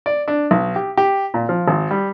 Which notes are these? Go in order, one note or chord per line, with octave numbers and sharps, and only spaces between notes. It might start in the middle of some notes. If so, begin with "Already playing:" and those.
D5
D4
B1
G4
G4
A#2
F3
G#1
G3